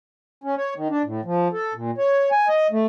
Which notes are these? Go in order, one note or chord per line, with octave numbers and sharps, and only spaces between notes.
C#4
C#5
D#3
D4
A2
F3
A4
A#2
C#5
G#5
D#5
A3